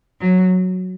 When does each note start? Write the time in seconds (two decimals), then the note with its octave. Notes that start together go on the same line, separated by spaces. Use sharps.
0.20 F#3